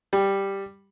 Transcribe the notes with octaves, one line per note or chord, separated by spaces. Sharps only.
G3